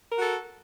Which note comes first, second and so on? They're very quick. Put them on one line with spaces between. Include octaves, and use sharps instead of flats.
A#4 F#4 A4